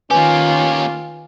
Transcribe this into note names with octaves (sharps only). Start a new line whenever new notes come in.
D#3 A#3 C#4 F4 G4 B4 G#5